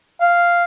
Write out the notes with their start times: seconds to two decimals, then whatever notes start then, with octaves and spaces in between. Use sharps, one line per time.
0.21 F5